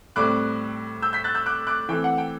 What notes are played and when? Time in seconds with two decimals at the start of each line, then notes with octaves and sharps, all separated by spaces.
0.16 A2 G3 C4 D6 F#6
1.02 E6 G6
1.13 G6 B6
1.24 F#6 A6
1.35 E6 G6
1.46 D6 F#6
1.67 D6 F#6
1.89 E3 A3 C4 G5
2.04 F#5
2.18 G5